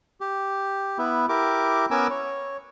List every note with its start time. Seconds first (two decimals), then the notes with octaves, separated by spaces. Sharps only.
0.21 G4
0.98 B3 E4
1.29 E4 G4 A#4 D6
1.91 B3 C#4 A#4 G#5 D6 E6
2.10 C#5